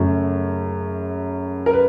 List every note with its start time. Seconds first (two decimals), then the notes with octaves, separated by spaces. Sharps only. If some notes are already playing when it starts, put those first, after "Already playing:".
Already playing: F#2 C#3 F#3 A3
1.66 A#4
1.73 B4